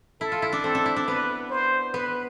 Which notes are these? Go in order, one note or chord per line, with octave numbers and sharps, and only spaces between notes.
E4 A4
F4
E4
D4
C4 A4
D4
E4
D4
B3 B4
C5
B3 B4